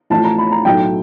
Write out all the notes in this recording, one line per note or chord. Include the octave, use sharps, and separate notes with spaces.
A1 A2 F3 A3 A5
A#5
B5
A#5
B1 A2 F#3 A3 G5